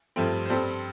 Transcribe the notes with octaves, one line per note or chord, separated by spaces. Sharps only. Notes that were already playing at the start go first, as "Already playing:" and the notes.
G2 F3 A3 C4
C5
G2 G3 C4 A4